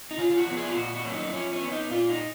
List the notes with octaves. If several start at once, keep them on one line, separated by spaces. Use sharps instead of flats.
D#4
C#3 F4
F4
F#4
F3 B3
G#4
F4
A#2 F#4
F#4
F#3 A#3 C#4
D#4
F3 C#4
C#4
B3
D#4
A#2 F4
D#4